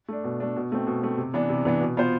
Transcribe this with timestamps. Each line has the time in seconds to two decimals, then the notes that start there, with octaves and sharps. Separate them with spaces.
0.08 A3 D4
0.24 B2
0.40 A3 D4
0.56 B2
0.72 A3 C4
0.87 B2
1.03 A3 C4
1.18 C3
1.34 E3 B3 D4
1.49 C3
1.65 E3 B3 D4
1.81 B2
1.97 B3 F4 C5